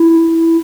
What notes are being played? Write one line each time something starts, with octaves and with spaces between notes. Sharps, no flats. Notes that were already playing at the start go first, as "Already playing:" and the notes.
Already playing: E4